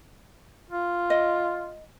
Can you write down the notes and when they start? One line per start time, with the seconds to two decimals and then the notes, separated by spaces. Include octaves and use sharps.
0.70 F4
1.10 D#5